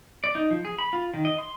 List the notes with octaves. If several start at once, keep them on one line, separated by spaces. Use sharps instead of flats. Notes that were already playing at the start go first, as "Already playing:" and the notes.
D5
D#4
F3
G#4
B5
F4
D#3
D#5
C6